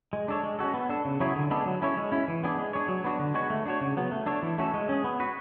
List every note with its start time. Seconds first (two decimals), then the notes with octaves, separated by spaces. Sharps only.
0.13 G#3
0.28 D4 A4 C#5
0.43 G#3
0.59 C#4 F#4 A4
0.74 B3
0.89 D4 A4
1.05 C#3
1.20 F#3 C#4 E4 G#4
1.35 D3
1.51 G#3 B3 D4 A4
1.66 F#3
1.82 C#4 E4 A4 C#5
1.97 G#3
2.12 C#4 E4
2.28 E3
2.43 B3 D4 G#4
2.58 G#3
2.73 D4 G#4 C#5
2.88 F#3
3.04 B3 D4 F#4
3.19 D3
3.34 G#3 B3 F#4 C#5
3.50 A3
3.66 D4 F#4 C#5
3.81 C#3
3.97 F#3 B3
4.12 A3
4.26 D4 A4 C#5
4.42 E3
4.58 A3 C#4 F#4 A4
4.74 G#3
4.89 C#4 G#4
5.04 B3
5.20 F#4 B4